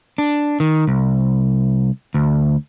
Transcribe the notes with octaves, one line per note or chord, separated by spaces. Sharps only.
D4
D#3
C2
D2